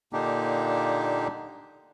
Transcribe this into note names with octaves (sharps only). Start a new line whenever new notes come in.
A#2 D3 A#3 D4 D#4 G4